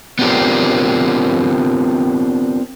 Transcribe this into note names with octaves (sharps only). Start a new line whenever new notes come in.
B3 C4 D4 F4 G4 A#4